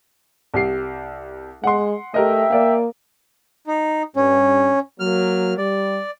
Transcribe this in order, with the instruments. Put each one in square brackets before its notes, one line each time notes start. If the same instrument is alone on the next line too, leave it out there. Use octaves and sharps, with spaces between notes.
[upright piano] C2 G4 C7
[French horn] G#3 [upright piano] F#5 C6
[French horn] A3 [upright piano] G4 A#4 D#5 [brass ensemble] E5 G5
[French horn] A#3 [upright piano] D5 F5
[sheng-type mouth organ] D#4
[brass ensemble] G2 [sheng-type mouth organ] C#4
[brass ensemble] F#3 A#3 [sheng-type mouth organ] F6
[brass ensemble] G3 [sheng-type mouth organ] D5